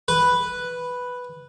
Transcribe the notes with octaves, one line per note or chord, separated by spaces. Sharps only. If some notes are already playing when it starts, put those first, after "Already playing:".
B4